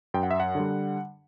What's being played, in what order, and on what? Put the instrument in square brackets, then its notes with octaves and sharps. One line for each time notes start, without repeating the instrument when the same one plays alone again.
[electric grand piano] F#2 G5
F#5
E5
F#5
D3 G3